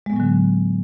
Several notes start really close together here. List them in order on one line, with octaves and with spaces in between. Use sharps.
G#3 B3 A2 F#3 D3